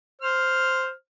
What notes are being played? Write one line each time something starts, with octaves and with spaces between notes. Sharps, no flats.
C5 F6